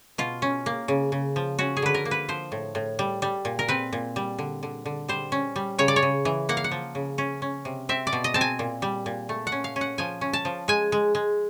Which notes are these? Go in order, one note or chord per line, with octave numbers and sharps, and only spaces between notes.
B2 F4
C#4
A#3
C#3
C#3
F3
C#4 F#4
G#4
D3 B4
A#4
A#3
B4
F3 C5
A2
A2
G3
G3
A#2
A#4
C4 B4
A#2
G3
D3
D3
D3
G3 C5
C#4
G3
C#3 C#5
D5
C#5
C#3
E3
A#3 F#5
F5
F#5
F3
C#3
C#4
C#4
C3
C4 E5
D5
B2
D#5
C4 A5
G#5
A#2
G3
A#2
A3
F#5
C#4
F5
C#4
F#5
F3 G#5
C#4
A5
F3
G#3 G#5
G#3
G#3